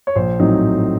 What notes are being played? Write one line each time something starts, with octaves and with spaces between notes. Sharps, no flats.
C#5
A#1 C5
A2 F#3 C4 D#4